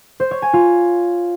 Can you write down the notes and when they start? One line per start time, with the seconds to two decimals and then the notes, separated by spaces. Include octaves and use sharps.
0.20 C5
0.31 C#5
0.42 G#5
0.53 F4